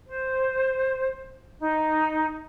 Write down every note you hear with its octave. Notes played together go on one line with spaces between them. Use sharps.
C5
D#4